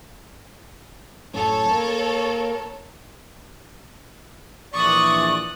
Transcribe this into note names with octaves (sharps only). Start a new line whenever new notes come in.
F#2 A2 C#4 A4 C#5
A#3 A#4
A#1 E3 D5 C#6 D#6 F#6